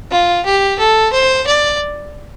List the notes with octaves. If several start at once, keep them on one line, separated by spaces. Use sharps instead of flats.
F4
G4
A4
C5
D5